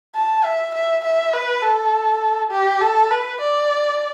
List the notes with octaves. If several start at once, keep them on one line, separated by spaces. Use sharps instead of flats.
A5
E5
E5
E5
B4
A4
G4
A4
B4
D5